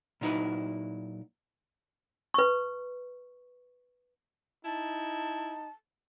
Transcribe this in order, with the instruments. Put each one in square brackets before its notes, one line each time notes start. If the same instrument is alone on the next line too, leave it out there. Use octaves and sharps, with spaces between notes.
[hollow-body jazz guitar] A#2 F#3 D#4 E4 B4
[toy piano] B4 C#6
[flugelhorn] D#4 [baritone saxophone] E4 [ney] A5